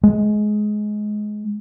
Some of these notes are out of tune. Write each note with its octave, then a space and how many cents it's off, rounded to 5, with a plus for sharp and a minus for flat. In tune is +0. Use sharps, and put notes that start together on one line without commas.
G#3 +20